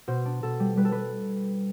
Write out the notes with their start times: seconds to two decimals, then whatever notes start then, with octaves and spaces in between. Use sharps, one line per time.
0.08 B2 C5
0.25 D4
0.43 B2 A4
0.60 G3
0.77 G3 B4
0.85 A4
0.92 G3 B4